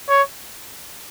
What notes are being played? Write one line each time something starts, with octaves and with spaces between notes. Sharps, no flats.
C#5